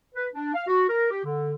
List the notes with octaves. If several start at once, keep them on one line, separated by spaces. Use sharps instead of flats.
B4
D4
F5
F#4
A#4
G4
D3